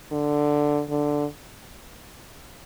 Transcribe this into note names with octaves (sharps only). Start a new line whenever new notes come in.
D3
D3